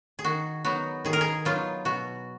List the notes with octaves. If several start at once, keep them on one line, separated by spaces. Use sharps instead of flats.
G#4
D#3 F#4
F#3 B3 D#4 F#4
D#3 G#4
A#4
G#4
F#3 B3 D#4 F4
B2 F#4